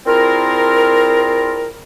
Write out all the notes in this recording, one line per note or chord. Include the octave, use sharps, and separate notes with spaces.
C4 D4 E4 F4 G#4 A#4